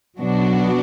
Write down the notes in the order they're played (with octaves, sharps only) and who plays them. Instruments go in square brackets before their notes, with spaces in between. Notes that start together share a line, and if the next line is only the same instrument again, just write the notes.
[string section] B2 F#3 B3 D4 F#4